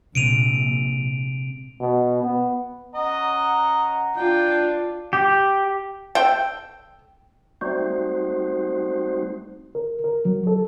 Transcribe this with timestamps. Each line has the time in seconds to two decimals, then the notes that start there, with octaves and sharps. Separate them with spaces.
0.15 A#1 C3 G#3 D7 D#7 F7
1.80 B2
2.23 B3
2.94 C#4 D#5 F#5 A#5
4.16 D4 F4 G5
5.13 G4
6.15 A4 G5
7.61 G3 A3 C4 D#4 F#4 C5
9.75 A#4
10.04 A#4
10.25 F#3
10.47 A4